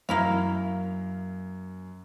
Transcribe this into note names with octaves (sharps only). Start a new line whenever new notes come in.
F#2 A#3 E4 F5